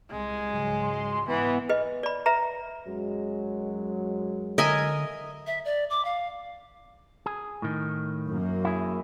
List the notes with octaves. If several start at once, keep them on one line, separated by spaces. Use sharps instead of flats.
C2 G#3
C#2 G#2 F#3
C6
G#2 E3 B3
B4 D#5
D5 B5
B4 E5 A#5
F#2 F#3 G#3
D3 A#4 D#5 E5 G#5
E5
D5
D6
F5
G#4
A2 D#3
F#2 A#3
E4 G#4